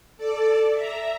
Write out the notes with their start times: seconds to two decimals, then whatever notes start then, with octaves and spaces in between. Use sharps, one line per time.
0.17 A4 D5
0.73 E5 A#5